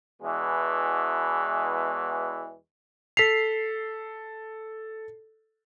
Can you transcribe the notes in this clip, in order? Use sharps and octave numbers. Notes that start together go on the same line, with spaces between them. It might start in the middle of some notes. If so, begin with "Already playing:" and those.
E2 B2 E3 G#3
A4 B6 C7 F7